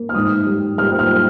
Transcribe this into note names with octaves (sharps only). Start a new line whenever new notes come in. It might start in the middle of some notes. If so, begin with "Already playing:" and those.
Already playing: A#3
F6
G#2 D#6
G3
G3 F6
F6